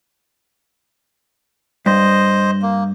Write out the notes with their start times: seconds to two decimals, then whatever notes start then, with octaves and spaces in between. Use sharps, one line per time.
1.86 G2 C5 D#5
2.62 A#3